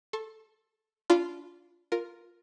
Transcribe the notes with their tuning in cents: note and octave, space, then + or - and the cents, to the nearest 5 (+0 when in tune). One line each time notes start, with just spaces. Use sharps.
A4 +0 C#6 -45
D4 -25 F4 -10 B5 -15
F4 +0 A#4 +0